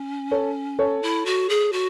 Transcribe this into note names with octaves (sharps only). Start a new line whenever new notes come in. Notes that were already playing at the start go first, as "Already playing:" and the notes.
Already playing: C#4
A4 C#5
A4 C#5
E4
F#4
G#4
F#4